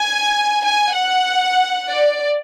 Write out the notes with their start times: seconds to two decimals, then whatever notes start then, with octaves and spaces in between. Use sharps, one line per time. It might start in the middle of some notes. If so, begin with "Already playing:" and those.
Already playing: G#5
0.64 G#5
0.96 F#5
1.90 D5